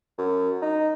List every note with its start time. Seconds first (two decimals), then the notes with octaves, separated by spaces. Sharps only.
0.18 F#2
0.62 D#4